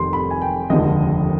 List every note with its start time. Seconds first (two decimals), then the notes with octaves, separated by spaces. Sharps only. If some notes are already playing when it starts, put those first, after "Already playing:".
Already playing: F1 F2 D#3 G3 C6
0.13 B5
0.31 G#5
0.42 G5
0.70 F1 D#2 D3 F3 G#3 D#5